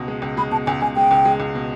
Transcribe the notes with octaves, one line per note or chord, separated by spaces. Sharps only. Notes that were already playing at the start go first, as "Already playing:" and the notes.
Already playing: C#2 B2
G#3
C#2
G#3 B5
B2 A5
C#2 G#5
C#2 G#5
G#3 G5
C#2
G#3
C#2
B2